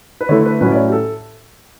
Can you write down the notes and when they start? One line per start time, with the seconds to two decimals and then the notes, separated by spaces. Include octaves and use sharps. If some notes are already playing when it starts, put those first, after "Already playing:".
0.21 B4
0.29 D3 A3 E4 C#5
0.46 B4
0.61 A2 F#3 C#4 E4 B4
0.72 D5
0.76 C#5
0.89 G4
0.92 A4